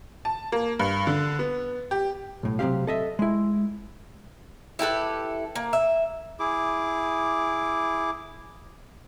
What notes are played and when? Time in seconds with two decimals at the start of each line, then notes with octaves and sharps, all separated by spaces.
0.25 A5
0.52 A#3
0.79 G2
1.07 D3
1.39 B3
1.91 G4
2.43 B1 A2
2.59 C3 F#3 G#3 C4 G4 F5
2.87 A4 D#5 E5
3.19 G#3 E4
4.79 E4 G4 A4 B4
5.55 A#3
5.73 E5
6.39 E4 G#4 D6